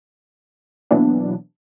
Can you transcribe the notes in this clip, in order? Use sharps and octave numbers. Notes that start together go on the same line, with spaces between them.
B2 E3 F#3 A#3 B3 D4